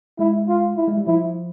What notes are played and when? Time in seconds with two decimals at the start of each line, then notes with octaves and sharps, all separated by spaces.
0.19 G#3 E4
0.48 F4
0.77 E4
0.88 G#3
0.97 G3
1.07 F3 E4